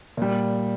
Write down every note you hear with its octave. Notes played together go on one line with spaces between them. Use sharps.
A#2 G3